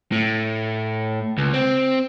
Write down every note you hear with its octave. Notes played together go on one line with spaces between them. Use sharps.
A2
C#2
C4